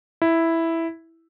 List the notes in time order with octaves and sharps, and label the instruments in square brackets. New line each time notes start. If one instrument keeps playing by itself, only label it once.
[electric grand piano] E4